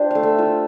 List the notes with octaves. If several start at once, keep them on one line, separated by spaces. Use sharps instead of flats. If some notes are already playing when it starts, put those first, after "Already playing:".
Already playing: D4 F4 G4 C5
A3 F5
E5
F4